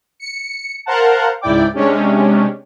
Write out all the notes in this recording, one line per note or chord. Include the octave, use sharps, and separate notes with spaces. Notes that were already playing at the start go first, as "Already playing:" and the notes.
C#7
A#4 C5 F5 F#5 A5
C#2 G#2 E4 D5 G5 D6
C3 G#3 C#4 D4 G4